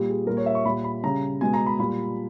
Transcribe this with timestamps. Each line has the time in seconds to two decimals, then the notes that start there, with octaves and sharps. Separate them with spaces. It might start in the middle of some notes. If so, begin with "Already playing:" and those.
Already playing: A#2 G3 G4
0.09 G#4
0.27 A#2 G3 A#4
0.37 C#5
0.46 E5
0.55 C#6
0.65 A#2 G3 B5
0.84 B5
1.03 C#3 G3 A#5
1.41 B2 G#3 G#5
1.54 A#5
1.66 B5
1.79 A#2 G3 B5